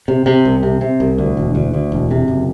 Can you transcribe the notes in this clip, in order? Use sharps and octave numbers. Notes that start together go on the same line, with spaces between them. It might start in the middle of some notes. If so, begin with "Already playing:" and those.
C3
C3
C2
C3
C3
C2
D2
E1
D2
D2
E1
C3
F#1